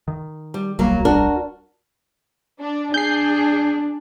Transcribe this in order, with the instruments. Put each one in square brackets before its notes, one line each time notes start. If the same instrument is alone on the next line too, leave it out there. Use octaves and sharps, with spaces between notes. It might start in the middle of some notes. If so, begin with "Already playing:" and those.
[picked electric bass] D#3
[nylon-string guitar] G3
[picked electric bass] D1 B1 G3 [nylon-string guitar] F#3 A#3
[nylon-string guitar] D4 F#4 A#4
[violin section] D4
[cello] D4 [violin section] G#4 [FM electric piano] G6 C7